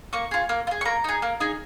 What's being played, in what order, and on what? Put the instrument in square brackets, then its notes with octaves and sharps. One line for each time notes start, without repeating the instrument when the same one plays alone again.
[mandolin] A#3 C#6
F4 G#4
A#3
F4
G#4
C#6
A#3 A#5
D#4 G#4
A#3
D#4 G#4